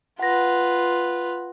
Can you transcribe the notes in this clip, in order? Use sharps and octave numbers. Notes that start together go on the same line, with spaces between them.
F4 B4 F#5 A#6